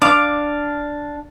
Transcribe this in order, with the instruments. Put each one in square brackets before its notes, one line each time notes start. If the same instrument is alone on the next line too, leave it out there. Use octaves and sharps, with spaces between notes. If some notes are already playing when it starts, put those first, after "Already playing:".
[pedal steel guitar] D4 F5 [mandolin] D6